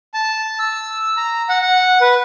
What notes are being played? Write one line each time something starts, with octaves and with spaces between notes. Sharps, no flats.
A5
E6
A#5
F#5
F#5
B4